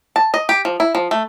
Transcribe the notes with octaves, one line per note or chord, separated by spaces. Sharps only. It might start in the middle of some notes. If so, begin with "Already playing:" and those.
A5
D#5
G4
F3
E4
F3
A3